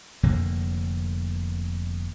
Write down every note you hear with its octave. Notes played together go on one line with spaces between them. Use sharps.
F1 F2 D3 A#3